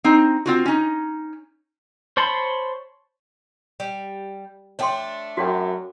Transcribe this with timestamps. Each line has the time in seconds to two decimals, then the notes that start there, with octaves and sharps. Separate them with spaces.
0.04 C4 D#4
0.46 C4 F4 F#4
0.66 C#4 D#4
2.17 C5 C#5 A5 B5 C6
3.80 G3
4.79 A3 D4 C#5 G5 C6
5.37 F#2 F#4 C#5 G5